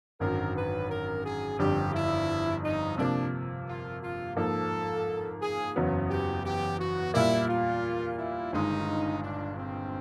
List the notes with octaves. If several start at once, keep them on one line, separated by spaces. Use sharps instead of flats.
G#1 F#2 D3 F#3 A#4
B4
A#4
G#4
G1 F2 D3 G3 G4
E4
D#4
C3 F3 A#3 D4
F4
F4
G#2 F3 A#3 A4
G#4
F#1 E2 C#3 F#3 B3
G4
G4
F#4
A#2 G3 A#3 E4
F4
E4
G1 G2 D#3 G#3 D#4
D4
C4